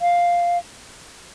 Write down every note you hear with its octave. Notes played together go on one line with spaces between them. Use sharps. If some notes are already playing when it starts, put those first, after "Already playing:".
F5